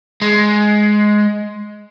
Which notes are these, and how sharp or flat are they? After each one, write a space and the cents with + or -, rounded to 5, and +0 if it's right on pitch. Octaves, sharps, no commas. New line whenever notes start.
G#3 +10